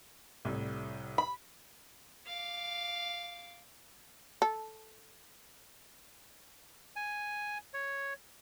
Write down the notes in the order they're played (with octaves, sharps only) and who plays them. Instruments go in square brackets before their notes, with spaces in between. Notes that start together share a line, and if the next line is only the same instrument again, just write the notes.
[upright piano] C2 A2
[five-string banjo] B5
[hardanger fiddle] F5 D6
[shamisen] A4
[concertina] G#5
C#5